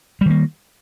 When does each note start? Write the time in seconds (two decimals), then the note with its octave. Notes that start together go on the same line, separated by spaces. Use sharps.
0.21 G3
0.26 D#3
0.30 A#3